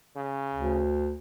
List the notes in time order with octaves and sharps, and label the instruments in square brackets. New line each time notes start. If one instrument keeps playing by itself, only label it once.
[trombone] C#3
[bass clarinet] D2